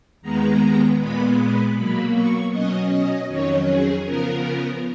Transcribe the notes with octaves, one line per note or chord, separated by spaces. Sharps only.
D#2 D#3 G#3 B3 A#5
A#2 G#3 B3 B5
B5
B2 F#3 A#3 B5
C#6
B2 F#3 C#4 D#5
D#5
F2 D#3 F#3 C#4 C#5
G#4
C#3 F3 B3 A#4